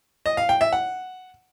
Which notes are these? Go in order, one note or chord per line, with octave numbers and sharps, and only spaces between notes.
D#5
F5
G5
E5
F#5